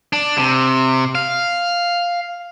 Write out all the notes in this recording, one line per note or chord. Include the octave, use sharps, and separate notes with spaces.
D4
C3
F5